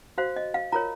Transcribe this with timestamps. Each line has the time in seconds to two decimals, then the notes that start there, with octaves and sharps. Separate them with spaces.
0.18 F#4 C5 F5
0.36 D#5
0.54 F5
0.72 F4 A#4 C#5 A#5